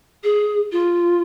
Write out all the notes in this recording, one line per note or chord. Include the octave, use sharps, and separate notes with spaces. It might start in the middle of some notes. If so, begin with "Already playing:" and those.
G#4
F4